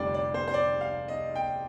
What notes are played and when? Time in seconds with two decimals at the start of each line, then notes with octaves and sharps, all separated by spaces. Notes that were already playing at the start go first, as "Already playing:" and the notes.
Already playing: F1 F2 D3 G3 D5 G5
0.14 D5
0.34 C5
0.48 C5
0.54 D5
0.81 F5
1.08 D#5
1.36 G5